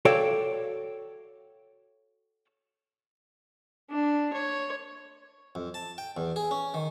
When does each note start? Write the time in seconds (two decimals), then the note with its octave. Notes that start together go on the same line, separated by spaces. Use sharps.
0.05 F#4 A4 C#5 D5 F5 G5
3.90 D4
4.33 C#5
5.55 F2
5.74 A5
5.98 G5
6.17 E2
6.36 G#4
6.51 C#4
6.74 D#3